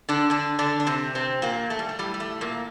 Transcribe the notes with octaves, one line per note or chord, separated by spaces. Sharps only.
D3 D4
D3 D4
D3 D4
D4
C3 C4
C3 C4
A#2 A#3
A3
G3
A3
A2 G3
G3
A3
A#2 A#3